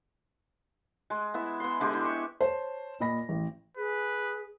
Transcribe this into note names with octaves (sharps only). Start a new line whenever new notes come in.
G#3
B3 E4 E5
B3 C6
D3 G#3 G4 G#4
E4
C#6
C5 C#5 A5
A#2 D#5 B5 A#6
A1
G#4 B4